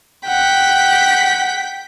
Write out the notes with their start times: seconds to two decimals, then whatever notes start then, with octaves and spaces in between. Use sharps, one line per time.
0.28 F#5 G5 B6